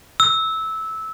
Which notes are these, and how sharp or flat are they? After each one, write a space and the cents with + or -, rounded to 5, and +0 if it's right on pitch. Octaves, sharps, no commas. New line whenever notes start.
E6 -15